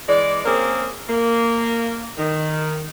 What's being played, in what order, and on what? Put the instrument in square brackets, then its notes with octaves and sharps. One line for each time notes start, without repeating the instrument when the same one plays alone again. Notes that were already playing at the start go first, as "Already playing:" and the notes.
[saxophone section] E3 G#3 D5
A#3 C4 C#4 G#4 A#4
A#3
D#3